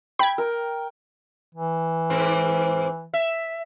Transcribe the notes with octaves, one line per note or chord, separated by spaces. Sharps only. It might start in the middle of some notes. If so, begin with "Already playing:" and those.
G5 B5 G#6
A#4
E3
G#2 C4
E5